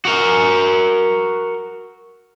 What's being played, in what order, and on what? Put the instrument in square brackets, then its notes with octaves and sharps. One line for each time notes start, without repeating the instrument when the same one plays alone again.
[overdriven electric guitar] F#4 A#4